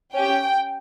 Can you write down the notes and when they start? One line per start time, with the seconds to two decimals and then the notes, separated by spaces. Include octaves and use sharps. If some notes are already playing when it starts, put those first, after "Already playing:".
0.13 C#4 G4 G5